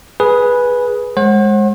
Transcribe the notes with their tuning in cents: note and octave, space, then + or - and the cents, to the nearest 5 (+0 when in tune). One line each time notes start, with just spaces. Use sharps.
G#4 +5 B4 -10
G#3 +0 C5 +45 F#5 +0